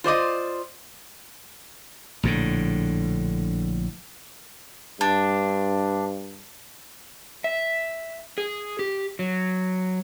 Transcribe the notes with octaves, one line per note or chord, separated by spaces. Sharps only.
F4 C5 D5 D#5
A#1 A2 D3
G2 D4
E5
G#4
G4
F#3